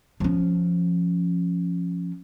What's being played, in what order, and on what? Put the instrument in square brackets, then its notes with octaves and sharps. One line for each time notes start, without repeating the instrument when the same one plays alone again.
[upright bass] F3 C#4